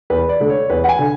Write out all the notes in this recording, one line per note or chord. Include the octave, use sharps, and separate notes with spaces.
E2 B4
D5
D3 A3
C#5
E2 B4
F#5
G#5
D3